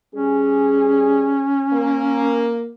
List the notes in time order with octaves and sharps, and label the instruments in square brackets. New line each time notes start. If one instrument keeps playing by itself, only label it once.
[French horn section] G3 G#4 [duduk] C#4
[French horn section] A#3